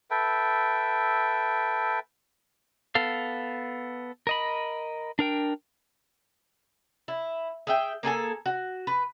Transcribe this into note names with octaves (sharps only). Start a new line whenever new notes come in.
A4 B4 E5 G5
B3 A4 F5
A#4 D#5 B5
D4 A#4 G5
E4
G#4 E5 G5
A#3 G#4 A4 G#5
F#4
B4